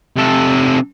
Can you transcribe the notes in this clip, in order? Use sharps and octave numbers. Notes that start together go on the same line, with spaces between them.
C3 A4